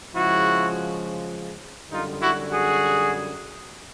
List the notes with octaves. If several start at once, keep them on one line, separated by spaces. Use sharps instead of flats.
C#3 F3 G#3 E4 F#4
F#2 D3 G3 D#4 F4
E4 F#4
F#4 G#4